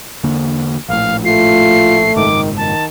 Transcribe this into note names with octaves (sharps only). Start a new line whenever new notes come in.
E2 D3 A#3
A#1 A2 F5
A3 F4 C7
F#1 G#2 D#3 G#3 D6
D#3 A5